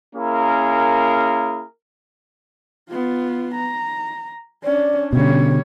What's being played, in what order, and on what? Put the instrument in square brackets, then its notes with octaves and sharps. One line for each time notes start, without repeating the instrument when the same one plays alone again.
[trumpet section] A#3 C#4 E4 G#4 A#4
[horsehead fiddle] B3 F4
A#5
[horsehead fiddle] C#4 D4 [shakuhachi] D5
[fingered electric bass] B2 D3 [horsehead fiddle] G3 C#5 [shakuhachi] C#4